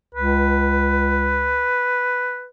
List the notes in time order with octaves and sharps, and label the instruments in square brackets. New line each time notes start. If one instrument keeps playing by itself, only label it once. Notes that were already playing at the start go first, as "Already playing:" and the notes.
[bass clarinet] C#2 [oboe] B4